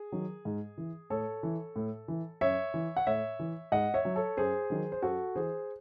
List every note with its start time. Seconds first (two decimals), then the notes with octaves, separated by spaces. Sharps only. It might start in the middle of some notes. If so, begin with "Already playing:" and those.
Already playing: G#4
0.12 D#3 F#3
0.45 G#2
0.78 E3
1.10 A2 A4 C#5
1.43 E3
1.76 A2
2.08 E3
2.41 F#2 C#5 E5
2.74 E3
2.97 F#5
3.07 A2 C#5 E5
3.39 E3
3.72 G#2 D#5 F#5
3.94 C#5 E5
4.05 F#3
4.16 A4 C#5
4.37 F#2 G#4 C5
4.70 D#3 F#3
4.92 C5
5.02 F#2 F#4 A4
5.35 E3 G#4 C5